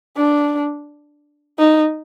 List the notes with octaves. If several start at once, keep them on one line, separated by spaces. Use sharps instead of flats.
D4
D#4